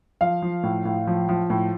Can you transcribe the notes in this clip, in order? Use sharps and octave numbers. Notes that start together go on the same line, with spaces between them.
F3 F5
F3
A2
A2
F3
F3
A2